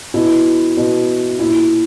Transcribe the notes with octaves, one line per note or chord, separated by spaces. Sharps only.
B2 E4
B2
A#2 E4